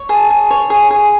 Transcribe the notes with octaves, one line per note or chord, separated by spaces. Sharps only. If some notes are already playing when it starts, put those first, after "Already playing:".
Already playing: C#5
G#4 A5
G#4
C#5
G#4
G#4